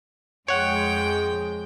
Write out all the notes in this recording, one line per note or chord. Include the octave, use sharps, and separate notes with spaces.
F2 G#3 C#5 F#5 G5